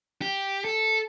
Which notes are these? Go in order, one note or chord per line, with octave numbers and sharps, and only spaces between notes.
G4
A4